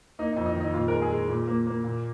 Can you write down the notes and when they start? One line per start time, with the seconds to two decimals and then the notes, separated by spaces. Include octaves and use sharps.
0.19 A#3 D#4
0.33 F2 D#4
0.46 D#4
0.55 D#3
0.61 D#4
0.74 A#2 F4
0.88 G#3 A#4
1.02 G#4
1.11 G#3
1.29 A#2
1.48 A#3
1.67 A#3
1.84 A#2